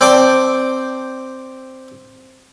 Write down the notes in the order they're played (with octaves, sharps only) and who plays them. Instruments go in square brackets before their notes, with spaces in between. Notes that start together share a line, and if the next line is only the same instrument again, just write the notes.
[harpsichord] C4 D5 G5 A5